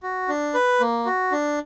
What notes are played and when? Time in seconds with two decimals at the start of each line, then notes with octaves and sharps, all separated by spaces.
0.03 F#4
0.28 D4
0.54 B4
0.80 A#3
1.06 F#4
1.32 D4